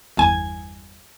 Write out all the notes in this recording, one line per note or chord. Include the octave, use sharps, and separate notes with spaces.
G1 E2 G#5